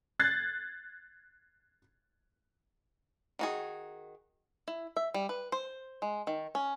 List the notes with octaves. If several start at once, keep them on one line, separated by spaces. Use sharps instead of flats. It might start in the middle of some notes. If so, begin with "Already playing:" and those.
F#6 G#6 A6 C7
D#3 F#4 G#4
E4
E5
G3
B4
C5
G#3
D#3
C#4